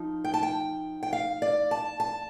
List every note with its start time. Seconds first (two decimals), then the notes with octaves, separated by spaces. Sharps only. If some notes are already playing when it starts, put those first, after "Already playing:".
Already playing: F3 D#4
0.24 G5
0.34 A5
0.43 G5
1.03 G5
1.13 F5
1.42 D5
1.71 A5
2.00 A5